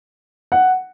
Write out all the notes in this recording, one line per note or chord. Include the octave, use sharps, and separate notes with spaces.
F#5